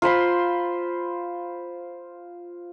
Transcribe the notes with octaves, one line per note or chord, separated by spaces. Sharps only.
F4 C5 B5 C6